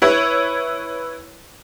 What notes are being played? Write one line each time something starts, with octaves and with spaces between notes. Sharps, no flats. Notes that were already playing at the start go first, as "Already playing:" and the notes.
E4 B4 C#5